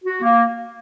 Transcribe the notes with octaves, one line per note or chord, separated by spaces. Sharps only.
F#4
A#3